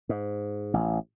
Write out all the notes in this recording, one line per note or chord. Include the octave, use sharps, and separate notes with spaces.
G#2
A1